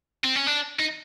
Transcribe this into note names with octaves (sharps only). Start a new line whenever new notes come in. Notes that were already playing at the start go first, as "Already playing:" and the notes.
C4
C#4
D4
D#4